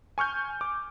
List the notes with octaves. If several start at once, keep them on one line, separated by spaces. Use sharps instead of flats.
G#5 C#6 F6 G6
D6